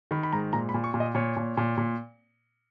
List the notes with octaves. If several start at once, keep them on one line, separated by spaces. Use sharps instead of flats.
D#3 B5
B5
G#2 A#5
A#2 A#5
B5
A#2
C#6
A#2
D#5
A#2 C#5
A#2
A#2
A#2